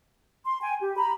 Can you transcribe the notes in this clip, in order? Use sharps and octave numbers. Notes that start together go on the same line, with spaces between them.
C6
G5 G#5
G4
A#5 B5